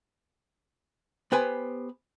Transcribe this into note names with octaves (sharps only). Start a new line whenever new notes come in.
B3 G4 B4 C5 G#5